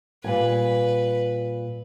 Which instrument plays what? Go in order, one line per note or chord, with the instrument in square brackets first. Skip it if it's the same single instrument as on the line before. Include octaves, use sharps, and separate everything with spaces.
[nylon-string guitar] A#2 G3 G#5 [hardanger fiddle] B4